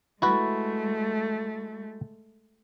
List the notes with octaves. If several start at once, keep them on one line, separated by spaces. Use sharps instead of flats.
G#3 A3 E4 F#4 B4